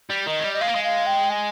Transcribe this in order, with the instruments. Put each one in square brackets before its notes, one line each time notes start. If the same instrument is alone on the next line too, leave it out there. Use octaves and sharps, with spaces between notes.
[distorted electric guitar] G3
[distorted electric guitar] D#3 [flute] D#5
[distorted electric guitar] G#3
G3
[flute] D#5
[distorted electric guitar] G#3 [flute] F5
[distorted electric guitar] A#3
G#3
[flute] F5
G5
G#5